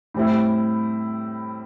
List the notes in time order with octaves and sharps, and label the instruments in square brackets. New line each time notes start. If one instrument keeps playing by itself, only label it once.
[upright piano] A2 G3 C4 E4